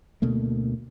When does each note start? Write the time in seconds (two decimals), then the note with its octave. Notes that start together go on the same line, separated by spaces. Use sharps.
0.22 D2 B2 A3 A#3